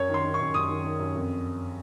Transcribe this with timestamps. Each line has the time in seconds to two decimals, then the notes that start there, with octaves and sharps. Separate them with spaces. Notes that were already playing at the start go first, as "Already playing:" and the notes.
Already playing: F#2 C#5
0.09 D#3 C6
0.25 D#3
0.34 C#6
0.40 F#2
0.54 F#2 D#6
0.69 D#3
0.84 D#3
0.99 F#2
1.15 F2